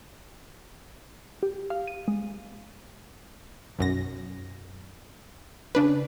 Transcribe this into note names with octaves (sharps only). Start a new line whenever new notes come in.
G4
F5
D#7
G#3
B1 F#2 A#6
C#3 D4 B4